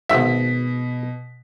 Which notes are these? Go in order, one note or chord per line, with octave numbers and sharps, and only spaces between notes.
G#1 B2 E5 B6